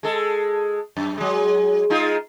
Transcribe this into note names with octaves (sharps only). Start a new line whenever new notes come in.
G#3 A4
F#2
F#3 G#3
G#3 D#4 F4